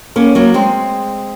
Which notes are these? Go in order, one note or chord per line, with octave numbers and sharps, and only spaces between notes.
A#3 C#4
F#3 A#3
G#3 C4